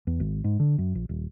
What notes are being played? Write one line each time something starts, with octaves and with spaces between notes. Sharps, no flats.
E2
G#1
G#2
D3
F#2
A#1
D#1